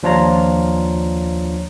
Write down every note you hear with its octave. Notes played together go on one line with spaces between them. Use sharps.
D#2 F3 D4 F4 C#5 A#5